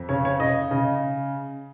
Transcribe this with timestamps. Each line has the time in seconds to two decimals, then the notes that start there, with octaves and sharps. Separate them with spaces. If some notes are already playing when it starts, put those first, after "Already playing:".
Already playing: F2
0.09 C#3 C#5
0.25 C#5
0.40 C#3 D#5
0.71 C#3